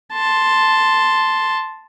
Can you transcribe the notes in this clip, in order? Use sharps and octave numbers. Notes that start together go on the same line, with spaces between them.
A5 C6